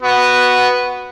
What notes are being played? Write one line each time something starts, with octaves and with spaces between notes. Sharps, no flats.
B3 F#4